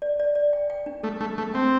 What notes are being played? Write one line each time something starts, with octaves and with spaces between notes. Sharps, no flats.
D5
D5
D5
G5
G5
D4
A3 A4
A3 D4
A3 A4
C4 G5